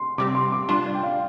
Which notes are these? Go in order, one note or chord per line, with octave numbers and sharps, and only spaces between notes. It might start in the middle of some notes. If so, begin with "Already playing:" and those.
Already playing: C6
C3 G3 C4 G4 D6
C6
D6
G3 D4 F4 C6
D5
G5
F5